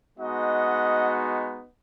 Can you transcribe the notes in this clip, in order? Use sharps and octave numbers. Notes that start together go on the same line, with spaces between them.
G#3 B3 D#4 F#4 D#5 F#5